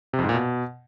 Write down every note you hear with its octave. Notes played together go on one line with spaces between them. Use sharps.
C3
F2
G#2
A#2
B2